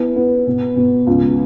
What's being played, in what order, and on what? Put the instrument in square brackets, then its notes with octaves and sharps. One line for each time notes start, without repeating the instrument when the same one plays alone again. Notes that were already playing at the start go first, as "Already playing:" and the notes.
Already playing: [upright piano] B3 E4
B3
B2
B2
C#2